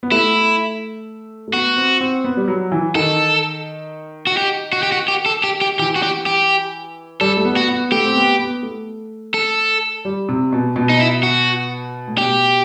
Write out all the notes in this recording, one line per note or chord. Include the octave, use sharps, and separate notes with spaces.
B3
A3 E4
A3
B3 F#4
C4
C4
B3
G3
F#3
E3
D#3 A4
F#4
G4
F#4
G4
F#4
G4
A4
G4
G4
E3 G4
F#4
G4
G4
G3 A4
A3
B3
F#4
B3
A3 G4
C4
B3
B3
A3
A4
G3
C3
B2
B2
D#4
E4
F#4
A2
B2 G4